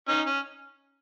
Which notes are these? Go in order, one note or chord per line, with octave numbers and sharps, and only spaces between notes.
C#4 D#4
C#4